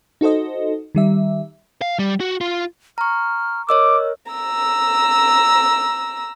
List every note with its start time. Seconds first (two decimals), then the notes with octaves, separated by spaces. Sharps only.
0.21 D#4 F#4 A4 C5 D#5
0.95 D#3 G3 E5
1.82 F5
1.99 G3
2.20 F#4
2.41 F4
2.98 A#5 C#6 F6
3.69 A#4 C#5 D#5 D6 E6
4.32 A#5 E6